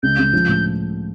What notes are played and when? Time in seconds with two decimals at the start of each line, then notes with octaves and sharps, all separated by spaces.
0.03 C#2 G6
0.19 C#2
0.33 F3
0.48 A2